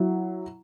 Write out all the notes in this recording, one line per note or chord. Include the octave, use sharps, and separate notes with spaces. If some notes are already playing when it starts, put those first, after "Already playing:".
Already playing: F#3 E4